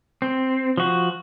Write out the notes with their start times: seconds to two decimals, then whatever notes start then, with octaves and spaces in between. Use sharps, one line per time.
0.22 C4
0.77 F3 F#4